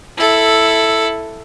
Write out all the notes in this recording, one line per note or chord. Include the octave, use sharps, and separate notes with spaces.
E4 A4